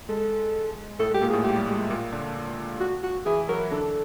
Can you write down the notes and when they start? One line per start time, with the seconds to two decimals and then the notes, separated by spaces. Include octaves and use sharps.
0.09 G#3 A4
1.00 A2 A3 A4
1.11 G#3
1.14 G4
1.21 A#2 A#3
1.30 A2 A3 G#4
1.44 G#3 G4
1.55 G3
1.68 G#3
1.79 G#3
1.90 A#2 A#3
2.13 D3 D4
2.80 F#4
3.03 F#4
3.26 E3 E4 G#4
3.49 F#3 F#4 A#4
3.71 D3 D4 A4